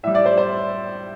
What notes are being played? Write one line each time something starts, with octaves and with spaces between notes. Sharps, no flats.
A2 G3 E5
D5
C5
C5